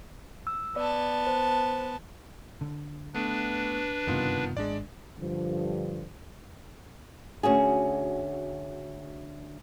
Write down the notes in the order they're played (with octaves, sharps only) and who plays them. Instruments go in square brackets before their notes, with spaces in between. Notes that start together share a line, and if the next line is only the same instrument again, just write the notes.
[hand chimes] E6
[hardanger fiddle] B3 A5 [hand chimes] D5
[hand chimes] C5
[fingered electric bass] D3
[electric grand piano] A3 B3 [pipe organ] D4 B4
[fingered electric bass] F#1 G2 C3 [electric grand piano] D#3 B3 F4
[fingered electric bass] G#1 [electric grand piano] G#3 D4 D5
[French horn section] G2 D3 F3
[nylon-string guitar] D2 C#4 F#4 G#4